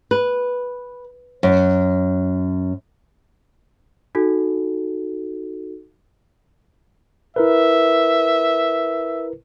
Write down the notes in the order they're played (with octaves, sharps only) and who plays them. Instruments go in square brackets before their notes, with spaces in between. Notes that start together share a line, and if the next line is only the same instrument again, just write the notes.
[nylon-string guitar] B4
F#2
[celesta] D#4 F#4 A4
[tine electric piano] E4 A#4 B4 [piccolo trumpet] E5